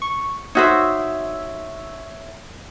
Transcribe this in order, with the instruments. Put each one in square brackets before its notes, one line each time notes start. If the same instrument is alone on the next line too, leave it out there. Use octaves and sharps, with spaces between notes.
[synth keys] C#6
[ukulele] D#4 F#4 C5 [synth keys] C#5 E5